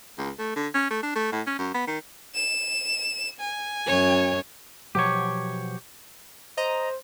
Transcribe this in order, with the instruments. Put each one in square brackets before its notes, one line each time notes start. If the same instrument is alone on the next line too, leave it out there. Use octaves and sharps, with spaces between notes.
[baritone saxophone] C#2
A3
D3
C#4
A3
D4
A3
A2
C#4
F#2
B3
D#3
[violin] E7
G#5
[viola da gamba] F#2 C#5
[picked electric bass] B2 F3 F#3 [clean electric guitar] G4 C#5
[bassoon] C5 [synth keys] D#5 A#5